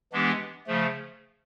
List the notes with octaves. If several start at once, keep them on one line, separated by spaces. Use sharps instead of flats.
E3 G#3 B3 D4 G4
C#3 F3 A3